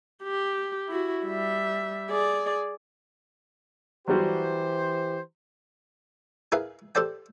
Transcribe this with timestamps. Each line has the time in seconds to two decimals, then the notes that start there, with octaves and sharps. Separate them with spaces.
0.23 G4
0.89 E4 F#4
1.26 G3 E5
2.10 G#4 D5
4.08 E3 F#3 G3 F#4 G4 C5
6.52 E4 G#4 A#4 B4 F5
6.95 G4 A4 C5 D5 G5